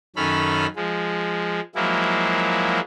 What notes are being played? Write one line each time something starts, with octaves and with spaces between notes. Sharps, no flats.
F#2 D#3 C#4 A4 B5 F6
F3 G#3
F3 F#3 G#3 A#3 E4